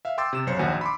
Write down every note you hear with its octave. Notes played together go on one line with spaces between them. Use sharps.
E5 F5
G5 C6 D6 E6 A6
C3 E7
B1 F#2 C5 C#5 C#7
A#1 D#2 F#4 G#5
B5 C6 D6